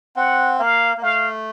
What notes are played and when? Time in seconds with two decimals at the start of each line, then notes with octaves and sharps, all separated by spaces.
0.16 C4 F#5
0.59 A#3 F5
0.97 A#3
1.02 A3 F5